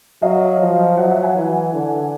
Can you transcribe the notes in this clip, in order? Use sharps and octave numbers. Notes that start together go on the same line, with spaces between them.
F#3 D#5 F5
F3
F#3 E5 F#5
E5 F#5
F#5 G#5
E3
D3